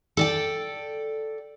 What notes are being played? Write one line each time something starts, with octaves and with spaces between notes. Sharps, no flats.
A4 D5 G5